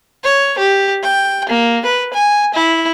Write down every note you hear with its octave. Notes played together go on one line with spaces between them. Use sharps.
C#5
G4
G5
A#3
B4
G#5
E4